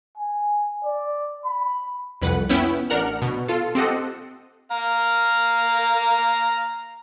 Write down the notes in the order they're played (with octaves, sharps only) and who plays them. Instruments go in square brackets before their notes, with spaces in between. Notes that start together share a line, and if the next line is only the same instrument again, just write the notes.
[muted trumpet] G#5
D5
B5
[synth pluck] C2 F2 B4 F#5
B3 C#4 E4 B4 G5
A1 D4 A#4 F#5 F6
B2
F4 A4
C4 G4 A4 D#5 F#5
[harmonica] F5 A#5